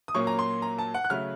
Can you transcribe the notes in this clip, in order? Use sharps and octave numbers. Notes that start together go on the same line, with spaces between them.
D#6
A#2 F#3 A#3 C#4 C#6
A#5
C6
A#5
A5
F#5
F#6
C#3 F#3 A3 F6